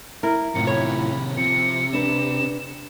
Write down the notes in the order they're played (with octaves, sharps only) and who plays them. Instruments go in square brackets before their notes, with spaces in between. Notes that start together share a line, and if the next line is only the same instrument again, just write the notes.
[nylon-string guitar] E4 [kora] A#4
[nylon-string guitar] F#2 A2 F4 [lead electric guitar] C3 D#3 [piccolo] C#7
[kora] C#5 [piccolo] B5
[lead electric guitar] C3 [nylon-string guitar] F3 [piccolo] C#7
[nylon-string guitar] D4 B4 [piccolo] E7